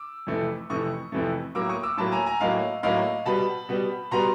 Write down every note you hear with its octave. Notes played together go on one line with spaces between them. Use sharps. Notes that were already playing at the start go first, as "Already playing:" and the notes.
Already playing: D6 E6
F2 C3 E3 A3
F2 C3 E3 A3 C#6 D#6
F2 C3 E3 A3
A2 F#3 A#3 D6 E6
C#6 D#6
D6 E6
A2 F#3 A#3 A5 B5
G#5 A#5
G#5 A#5
A2 F#3 A#3 D#5 F5
A2 F#3 A#3 D#5 F5
B2 G3 B3 A5 B5
B2 G3 B3
B2 G3 B3 A#5 C6